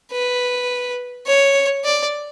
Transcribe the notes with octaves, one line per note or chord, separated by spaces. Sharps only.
B4
C#5
D5